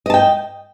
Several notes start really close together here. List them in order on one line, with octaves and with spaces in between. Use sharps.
D#5 A5 G5